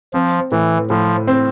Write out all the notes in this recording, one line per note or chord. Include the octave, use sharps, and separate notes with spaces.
F3 C4
A2 E3
A2 F3
C4